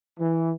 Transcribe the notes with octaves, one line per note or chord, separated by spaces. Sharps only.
E3